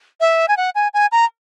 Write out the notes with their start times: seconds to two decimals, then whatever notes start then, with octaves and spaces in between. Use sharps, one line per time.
0.20 E5
0.48 G#5
0.57 F#5
0.75 G#5
0.94 G#5
1.12 A#5